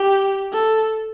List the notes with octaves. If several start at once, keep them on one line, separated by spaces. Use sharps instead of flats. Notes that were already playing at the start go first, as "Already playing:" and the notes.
Already playing: G4
A4